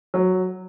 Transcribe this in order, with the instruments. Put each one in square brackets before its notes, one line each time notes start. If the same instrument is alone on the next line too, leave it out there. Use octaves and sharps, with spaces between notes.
[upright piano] F#3